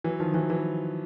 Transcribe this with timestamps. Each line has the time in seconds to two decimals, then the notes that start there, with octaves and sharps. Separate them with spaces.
0.04 E3 F#3
0.20 D#3 F3
0.34 E3 F#3
0.50 E3 F#3